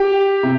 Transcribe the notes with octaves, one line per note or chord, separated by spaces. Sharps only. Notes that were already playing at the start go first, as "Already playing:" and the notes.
Already playing: G4
C3